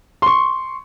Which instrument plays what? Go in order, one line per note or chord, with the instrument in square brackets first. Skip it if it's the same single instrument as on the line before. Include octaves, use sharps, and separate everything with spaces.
[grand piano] C6 C#6